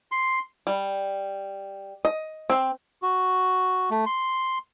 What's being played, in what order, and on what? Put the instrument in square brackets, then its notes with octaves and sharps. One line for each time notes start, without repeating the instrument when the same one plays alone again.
[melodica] C6
[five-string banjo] G3
D#5
C4
[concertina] F#4
A3
C6